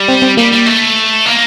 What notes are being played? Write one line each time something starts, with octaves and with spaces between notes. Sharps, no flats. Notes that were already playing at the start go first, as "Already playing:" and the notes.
Already playing: G3
C4
C4
G3 A#3
G3
A3
A#3